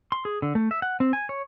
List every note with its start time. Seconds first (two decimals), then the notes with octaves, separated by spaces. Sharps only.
0.12 C6
0.25 G#4
0.42 D3
0.55 A3
0.71 E5
0.82 F#5
1.00 C4
1.13 G#5
1.29 C#5